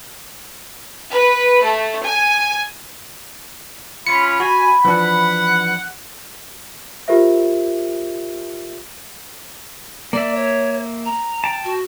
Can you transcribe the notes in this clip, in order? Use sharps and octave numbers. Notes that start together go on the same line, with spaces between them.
B4
A3
G#5
C#4 F4 B5 C#7
F#4 G#5
E3 F3 D4 F#5
F4 G4 A#4 C5 E5
A#3 D5 E5
C#5
A#5
G5 A5
F#4